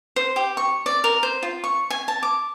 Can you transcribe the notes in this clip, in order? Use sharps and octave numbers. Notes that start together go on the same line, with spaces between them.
C5
G4
C#6
D5
A#4
C5
F4
C#6
G#5
A5
D6